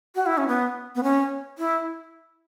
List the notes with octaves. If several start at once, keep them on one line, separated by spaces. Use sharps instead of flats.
F#4
E4
C#4
B3
B3
C#4
E4